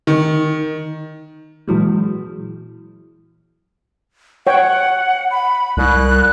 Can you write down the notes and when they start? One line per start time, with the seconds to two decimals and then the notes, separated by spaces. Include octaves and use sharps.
0.07 D#3
1.68 A#2 E3 F#3 G#3
4.47 C#5 F#5 G5
5.31 B5
5.77 C2 F#6